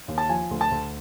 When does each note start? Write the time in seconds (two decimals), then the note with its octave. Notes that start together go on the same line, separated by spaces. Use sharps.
0.08 D#2
0.18 A5
0.29 F3 G#5
0.51 D2
0.61 A5
0.71 D2